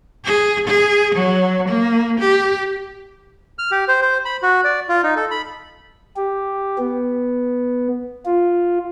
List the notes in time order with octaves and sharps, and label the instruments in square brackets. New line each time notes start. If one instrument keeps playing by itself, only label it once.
[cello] G#4
G#4
F#3
A#3
G4
[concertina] F6
G4
C5
C5
B5
F#4
D5
F4
D#4
A4
B5
[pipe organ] G4
B3
F4